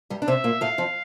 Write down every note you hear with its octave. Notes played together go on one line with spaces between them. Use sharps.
G2 G3
D4
C3 C4 E5
A#2 A#3
A2 A3 F5
F2 F3